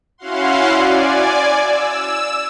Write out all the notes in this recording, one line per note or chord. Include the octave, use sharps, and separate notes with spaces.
C#4 E4 F#4 F5 F#5 C6
D5 G#5
E6